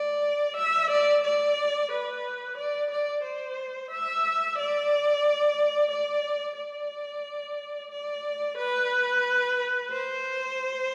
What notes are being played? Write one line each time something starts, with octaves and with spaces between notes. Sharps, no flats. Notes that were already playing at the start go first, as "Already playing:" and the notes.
Already playing: D5
E5
D5
D5
B4
D5
D5
C5
E5
D5
D5
D5
D5
B4
C5